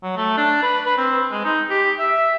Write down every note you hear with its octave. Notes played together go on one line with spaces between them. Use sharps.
F#3
A3
D4
B4
B4
C4
G#3
D#4
G4
E5